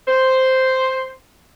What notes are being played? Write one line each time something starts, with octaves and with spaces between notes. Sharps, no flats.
C5